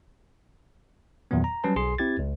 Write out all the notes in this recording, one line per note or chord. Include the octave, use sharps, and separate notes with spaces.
E2 A#2 D#3 F#3 B3
A#5
F#3 G3 C#4 B4 A5
B1 G#4 C6 C7
C4 E4 G4 G#6 A6
C#2